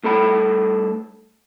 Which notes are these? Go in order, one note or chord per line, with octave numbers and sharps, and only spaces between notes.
G2 A3 A4 B5